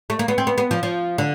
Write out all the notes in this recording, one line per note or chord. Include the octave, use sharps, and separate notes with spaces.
A3
A#3
B3
C4
B3
B3
F3
F3
D3